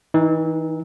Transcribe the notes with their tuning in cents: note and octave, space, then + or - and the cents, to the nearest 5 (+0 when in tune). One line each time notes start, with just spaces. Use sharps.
E3 -35 D#4 +0